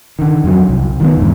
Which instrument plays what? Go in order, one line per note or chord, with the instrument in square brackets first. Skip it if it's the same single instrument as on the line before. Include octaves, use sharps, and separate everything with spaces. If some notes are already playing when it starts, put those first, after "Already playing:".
[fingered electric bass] D3 D#3
F2 E3 F#3
C2
D#3 F3 B3
E2 G#2 D3